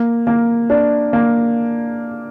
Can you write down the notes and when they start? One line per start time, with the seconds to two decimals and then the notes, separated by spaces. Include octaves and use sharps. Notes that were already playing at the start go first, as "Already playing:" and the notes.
Already playing: A#3
0.27 A#3
0.70 D4
1.13 A#3